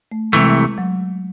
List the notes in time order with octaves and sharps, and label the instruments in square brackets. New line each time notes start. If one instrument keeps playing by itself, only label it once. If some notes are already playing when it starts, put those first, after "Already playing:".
[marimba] A3
[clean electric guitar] C2 C3 E3 A3 [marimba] G#3
[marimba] F#3